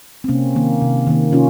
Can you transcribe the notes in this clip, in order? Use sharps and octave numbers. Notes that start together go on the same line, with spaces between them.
C4
C3 A#3 C#4
D#3 A#3
C3
D#3 A#3
C3 C#4 F4